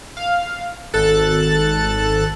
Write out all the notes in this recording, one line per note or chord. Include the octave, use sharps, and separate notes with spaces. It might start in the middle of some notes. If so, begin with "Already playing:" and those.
F5
G#1 A4 F#6 A6